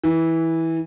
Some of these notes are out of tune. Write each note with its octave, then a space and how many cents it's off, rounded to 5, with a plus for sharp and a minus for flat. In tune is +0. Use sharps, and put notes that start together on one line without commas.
E3 -15